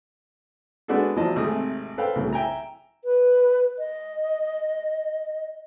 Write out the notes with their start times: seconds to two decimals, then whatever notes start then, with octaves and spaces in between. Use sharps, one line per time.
0.88 G#3 B3 D4 F#4 G#4 A4
1.16 E2 F3 F#3 D5 D#5 A5
1.36 G#1 C3 A3 G#4 D#6
1.98 A4 B4 C5 F5 G5
2.16 C2 A2 C#3 F#3
2.33 E5 G5 G#5 A#5
3.05 B4
3.79 D#5